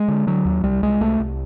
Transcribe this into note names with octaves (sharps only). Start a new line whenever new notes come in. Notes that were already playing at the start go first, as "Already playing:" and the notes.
Already playing: G#3
D3
D3 F#3
D#2
C2 G3
C2 G#3
C2 A3
C2